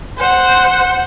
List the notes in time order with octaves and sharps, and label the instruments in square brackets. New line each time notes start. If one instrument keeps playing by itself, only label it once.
[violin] C5 F#5